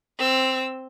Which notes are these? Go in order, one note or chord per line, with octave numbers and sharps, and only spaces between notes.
C4 E6